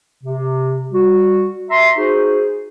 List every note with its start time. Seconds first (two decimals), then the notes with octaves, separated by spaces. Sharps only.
0.24 C3
0.92 G3 F#4
1.70 E5 A#5 C6
1.97 D#4 F#4 G#4 C5